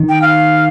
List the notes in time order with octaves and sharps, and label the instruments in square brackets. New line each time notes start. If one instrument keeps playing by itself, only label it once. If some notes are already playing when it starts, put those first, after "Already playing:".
Already playing: [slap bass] D#3
[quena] G5
F5